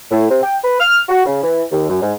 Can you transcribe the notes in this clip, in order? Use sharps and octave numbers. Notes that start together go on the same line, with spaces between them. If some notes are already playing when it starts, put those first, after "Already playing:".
A2
C3
G5
B4
F6
F#4
C#3
E3
D#2
F#2
G#2